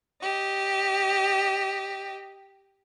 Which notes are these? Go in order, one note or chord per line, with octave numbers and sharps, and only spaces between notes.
G4 D#5